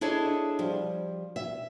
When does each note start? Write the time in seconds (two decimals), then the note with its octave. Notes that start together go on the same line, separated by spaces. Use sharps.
0.01 D4 E4 G#4 A4 C#5 D#5
0.59 F3 G3
1.36 E5